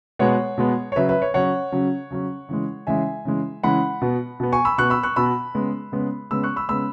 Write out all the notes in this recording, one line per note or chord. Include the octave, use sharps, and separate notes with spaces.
B2 G#3 B3 C#5 F#5
B2 G#3 B3
C#5
C#3 F#3 C#4 B4 E5
B4 E5
C#5
C#3 F#3 C#4 C#5 F#5
C#3 F#3 C#4
C#3 F#3 C#4
C#3 E3 G#3
C#3 E3 G#3 E5 G#5
C#3 E3 G#3
C#3 E3 G#3 F#5 B5
B2 B3
B2 B3
G#5 C#6
B5 E6
B2 B3 C#6 F#6
B5 E6
C#6 F#6
B2 B3 B5 E6
C#3 G#3 B3
C#3 G#3 B3
C#3 G#3 B3 B5 E6
C#6 F#6
B5 E6
C#3 G#3 B3 B5 E6